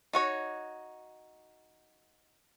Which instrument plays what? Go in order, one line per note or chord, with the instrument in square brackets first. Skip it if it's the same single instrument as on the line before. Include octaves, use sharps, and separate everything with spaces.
[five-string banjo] D#4 F#4 C#5